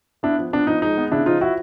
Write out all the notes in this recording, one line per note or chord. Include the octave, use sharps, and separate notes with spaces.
B3 D4 E4
F3
B3 D4
F3 D#4
G#3 D#4
B3
C#3 D4 E4
F3 D#4 F4
F3 E4 F#4